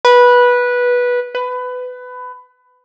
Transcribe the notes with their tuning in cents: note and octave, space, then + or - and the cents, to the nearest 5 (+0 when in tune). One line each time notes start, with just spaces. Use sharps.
B4 -15
B4 +20